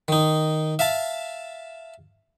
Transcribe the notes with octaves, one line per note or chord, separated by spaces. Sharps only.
D#3 D#4
E5 F5 A5